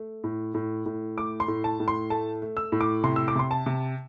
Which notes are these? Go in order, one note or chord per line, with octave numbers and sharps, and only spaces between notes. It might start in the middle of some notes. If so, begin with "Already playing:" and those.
Already playing: A3
A2
A2
A2
A3 D6
C6
A2
A5
A2
C6
A3 A5
A3
E6
A2
D6
C3 C6
E6
D6
C3 C6
A5
C3